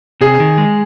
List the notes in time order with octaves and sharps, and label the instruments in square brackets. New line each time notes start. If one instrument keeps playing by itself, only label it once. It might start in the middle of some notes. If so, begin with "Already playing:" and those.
[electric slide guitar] C3 [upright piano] G#4
[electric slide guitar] D#3
G#3